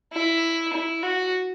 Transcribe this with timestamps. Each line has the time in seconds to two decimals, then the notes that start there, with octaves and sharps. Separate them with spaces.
0.13 E4
0.73 E4
1.03 F#4